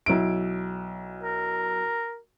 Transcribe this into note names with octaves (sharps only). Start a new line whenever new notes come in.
B1 E4 D7
A#4